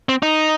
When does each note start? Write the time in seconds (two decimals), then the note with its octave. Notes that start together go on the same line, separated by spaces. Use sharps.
0.09 C4
0.23 D#4